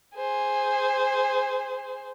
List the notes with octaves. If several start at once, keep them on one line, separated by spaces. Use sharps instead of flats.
G#4 C5